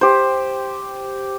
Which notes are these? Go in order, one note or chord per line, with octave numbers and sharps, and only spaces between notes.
G4 C5